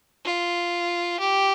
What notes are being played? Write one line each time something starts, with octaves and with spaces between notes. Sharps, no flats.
F4
G4